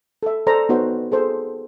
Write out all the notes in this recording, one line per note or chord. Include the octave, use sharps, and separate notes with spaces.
A4 E5
A4 C5 D5 A#5
B3 D#4 F#4 C5 C#5
G#4 A4 C5